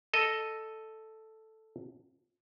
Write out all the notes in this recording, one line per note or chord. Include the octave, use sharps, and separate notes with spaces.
A4 D#5